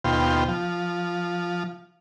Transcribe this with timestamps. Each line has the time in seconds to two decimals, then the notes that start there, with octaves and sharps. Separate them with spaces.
0.05 D#2 B2 F4 C5 G5
0.48 F3